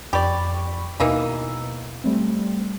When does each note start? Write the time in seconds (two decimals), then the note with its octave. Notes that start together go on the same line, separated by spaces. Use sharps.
0.13 F2 G4 D5 B5 C#6
1.00 D#2 B2 E3 A#3 D#4 E6
2.04 G3 A3 C4